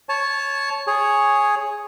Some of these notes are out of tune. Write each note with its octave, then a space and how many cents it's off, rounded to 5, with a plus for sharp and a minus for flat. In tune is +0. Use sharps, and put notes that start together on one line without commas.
C#5 +0 A5 -20
G#4 +0 C#5 +0